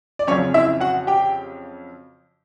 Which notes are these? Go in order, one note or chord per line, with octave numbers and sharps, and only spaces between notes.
D5
F2 C#3 F#3 C#4 C#5
E4 E5
F#4 F#5
G4 G5